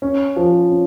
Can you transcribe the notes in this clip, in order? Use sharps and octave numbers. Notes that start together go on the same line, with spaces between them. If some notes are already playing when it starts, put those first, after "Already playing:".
C#4
F3
C#4